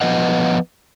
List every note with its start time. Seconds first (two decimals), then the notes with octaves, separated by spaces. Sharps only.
0.01 F3 B3 B4 D#5 F#5